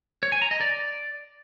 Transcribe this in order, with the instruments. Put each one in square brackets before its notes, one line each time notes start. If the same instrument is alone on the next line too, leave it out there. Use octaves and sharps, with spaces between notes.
[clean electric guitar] C#5
G#5
A#5
D#5
D5